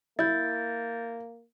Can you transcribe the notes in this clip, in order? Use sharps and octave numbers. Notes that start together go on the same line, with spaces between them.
A#3 E4 G6 A6